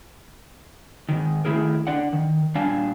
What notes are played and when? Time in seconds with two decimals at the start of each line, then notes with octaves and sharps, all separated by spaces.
1.09 G#2 D#3
1.45 D#3 A3 E4 G#4 A#4
1.87 D4 D5 F#5
2.13 D#3
2.55 A#2 G3 D4 F5 G#5 A5